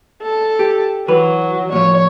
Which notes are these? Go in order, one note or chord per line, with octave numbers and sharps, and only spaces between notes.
A4
G4
E3 F#3 B4
A2 F3 C#5